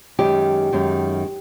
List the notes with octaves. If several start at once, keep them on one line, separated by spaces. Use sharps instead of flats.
F#2 D#3 G#3 G4
F#2 D#3 G#3